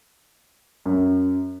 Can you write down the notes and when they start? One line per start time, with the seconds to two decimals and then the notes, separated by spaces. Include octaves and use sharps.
0.86 F#2